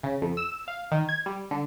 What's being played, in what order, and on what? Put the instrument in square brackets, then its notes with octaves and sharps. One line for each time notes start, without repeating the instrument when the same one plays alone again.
[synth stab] C#3
F2
E6
F5
D#3
G#6
G3
D3